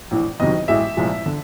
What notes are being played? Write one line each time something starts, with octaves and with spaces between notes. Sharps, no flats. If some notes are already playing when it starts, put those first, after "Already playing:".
A#1 A2 E3
F#1 F2 C3 D#3 F#3 D#5
A1 A2 E3 G#3 E5
C2 A#2 F3 G#3
D3